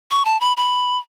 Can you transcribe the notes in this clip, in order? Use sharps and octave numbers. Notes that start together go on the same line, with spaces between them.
C#6
A5
B5
B5